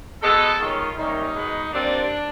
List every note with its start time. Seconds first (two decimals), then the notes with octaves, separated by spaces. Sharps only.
0.22 B2 G#3 B3 A4
0.59 D#3 G#3 C#4 F4
0.97 C3 D#3 G3 A#3 C#4 D#4
1.35 B2 G#3 B3
1.72 A#2 G3 C4 D4